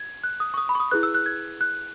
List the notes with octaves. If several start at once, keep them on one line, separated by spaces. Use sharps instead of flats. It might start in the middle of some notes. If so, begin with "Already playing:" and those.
Already playing: G#6
F#6
D#6
C#6
D#6
B5
C#6
D#6
E4 G#4 B4 F#6
E6
F#6
G#6
F#6